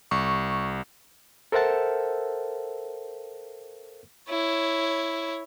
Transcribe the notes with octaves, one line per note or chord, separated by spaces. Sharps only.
C2 C#6
A4 A#4 C5 E5 F#5 A5
E4 C#5